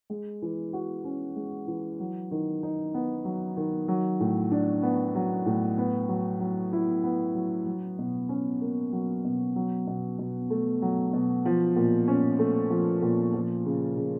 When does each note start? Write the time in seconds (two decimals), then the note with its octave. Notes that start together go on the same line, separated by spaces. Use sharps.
0.10 G#3
0.42 E3
0.73 F#4
1.04 C#4
1.36 G#3
1.67 E3
2.00 F#3
2.31 D#3
2.63 D#4
2.94 B3
3.25 F#3
3.57 D#3
3.88 F#3
4.20 A2
4.51 D4
4.83 B3
5.15 F#3
5.46 A2
5.78 B3
6.09 F#3
6.40 F#3
6.73 E4
7.04 B3
7.35 F#3
7.66 F#3
7.99 B2
8.29 C#4
8.61 A#3
8.93 F#3
9.25 B2
9.56 F#3
9.87 B2
10.19 B2
10.50 A3
10.82 F#3
11.13 B2
11.45 F3
11.76 A#2
12.08 C#4
12.39 A3
12.70 F3
13.02 A#2
13.34 F3
13.65 C#3
13.97 C#3